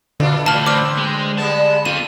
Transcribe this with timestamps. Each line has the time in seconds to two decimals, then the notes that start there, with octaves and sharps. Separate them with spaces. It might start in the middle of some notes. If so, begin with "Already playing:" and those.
0.20 A#2 D3 D4 F4
0.46 A2 E3 A5 F6
0.66 C4 D4 B4 D6 F6
0.97 G#3
1.38 G3 G#3 B3 A5
1.85 C4 F4 A4 D#7